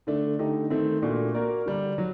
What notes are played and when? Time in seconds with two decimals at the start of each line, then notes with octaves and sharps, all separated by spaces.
0.07 D3 A3 D4
0.39 D3 A3 D#4 G4
0.70 D#3 A3 C4
1.02 A#2 A3 D4 F#4
1.34 A#3 F#4 A#4 D5
1.66 D3 G3 D4
1.98 F#3